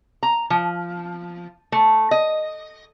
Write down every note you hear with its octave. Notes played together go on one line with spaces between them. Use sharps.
A#5
F3
A3
D#5